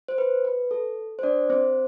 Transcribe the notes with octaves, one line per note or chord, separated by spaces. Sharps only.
C5
B4
B4
A4
C5
D4 D5
C4 C5